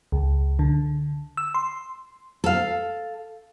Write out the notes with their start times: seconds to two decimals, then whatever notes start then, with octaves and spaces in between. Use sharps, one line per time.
0.12 C#2
0.59 D3
1.37 E6
1.54 C6
2.44 A4 F5